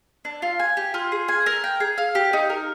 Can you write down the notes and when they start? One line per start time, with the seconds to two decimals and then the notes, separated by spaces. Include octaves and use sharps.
0.25 D4
0.42 F4
0.60 G#5
0.77 G4
0.94 F4
1.12 G#4
1.28 G#5
1.46 A#4
1.64 G5
1.80 G#4
1.98 F5
2.15 G4
2.33 D#4
2.50 A#4